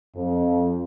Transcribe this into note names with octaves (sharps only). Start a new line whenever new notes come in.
F2